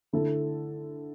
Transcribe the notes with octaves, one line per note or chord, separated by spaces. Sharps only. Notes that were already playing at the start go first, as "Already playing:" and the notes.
D3 A3 E4 A4